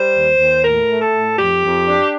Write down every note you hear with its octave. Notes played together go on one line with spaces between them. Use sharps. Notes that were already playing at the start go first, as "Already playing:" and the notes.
Already playing: G3 C5
D#2
D#2
A2 A#4
A3
A4
A2
F2 G4
F2
D4